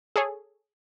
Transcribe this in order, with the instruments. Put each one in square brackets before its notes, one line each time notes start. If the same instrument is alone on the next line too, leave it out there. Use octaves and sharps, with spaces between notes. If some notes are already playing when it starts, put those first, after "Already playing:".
[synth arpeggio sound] G#4 A4 C#5